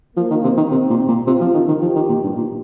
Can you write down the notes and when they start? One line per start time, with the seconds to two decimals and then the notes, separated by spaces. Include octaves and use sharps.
0.17 F3 A#3
0.31 D#3
0.44 C3
0.57 D#3
0.71 C3 C4
0.90 A#2
1.08 A#2
1.27 C3 F4
1.41 F3
1.54 D#3
1.68 D#3
1.82 F3 G4
1.96 D#3
2.09 A#2
2.23 G2
2.37 A#2